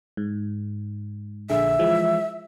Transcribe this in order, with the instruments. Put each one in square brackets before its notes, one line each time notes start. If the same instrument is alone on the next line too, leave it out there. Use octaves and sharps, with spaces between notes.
[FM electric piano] G#2
[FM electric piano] A#1 D3 G#4 [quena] E5
[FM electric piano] E3 F3 G#3